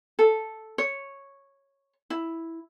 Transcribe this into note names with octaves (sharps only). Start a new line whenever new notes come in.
A4
C#5
E4